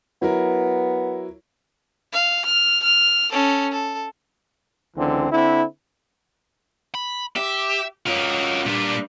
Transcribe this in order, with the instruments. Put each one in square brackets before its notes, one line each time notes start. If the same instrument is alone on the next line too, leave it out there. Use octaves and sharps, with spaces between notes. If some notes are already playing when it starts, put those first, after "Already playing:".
[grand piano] F#3 E4 A#4 [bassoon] B3
[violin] F5
F6
F6
C#4 A4
A4
[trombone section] C#2 D3 E3 C4
D3 C4 E4
[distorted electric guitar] B5
[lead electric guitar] G4 [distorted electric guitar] E5
[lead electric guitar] C#4 F4 [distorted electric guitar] F#4 A#4
[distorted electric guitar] A#2 A#3 [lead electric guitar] G3 D4